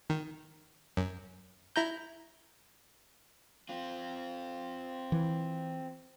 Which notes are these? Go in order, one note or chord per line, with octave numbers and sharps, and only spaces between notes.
D#3
F#2
E4 A#5 G6
C4 F4
E3